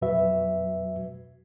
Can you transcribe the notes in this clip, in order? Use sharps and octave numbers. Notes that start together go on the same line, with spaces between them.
F2 B2 F#3 F#4 B4 E5